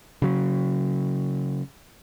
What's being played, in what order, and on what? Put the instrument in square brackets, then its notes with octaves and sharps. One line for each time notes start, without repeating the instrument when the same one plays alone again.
[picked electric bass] C#3 F#3